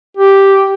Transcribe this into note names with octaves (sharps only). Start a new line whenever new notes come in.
G4